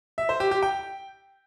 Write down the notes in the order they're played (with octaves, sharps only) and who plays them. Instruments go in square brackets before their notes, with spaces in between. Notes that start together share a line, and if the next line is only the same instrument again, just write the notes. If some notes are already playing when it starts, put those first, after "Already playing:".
[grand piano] E5
C5
G4
G4
G5